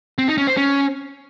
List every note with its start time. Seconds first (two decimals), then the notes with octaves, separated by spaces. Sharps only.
0.18 C4
0.28 D#4
0.38 C#4
0.47 C5
0.57 C#4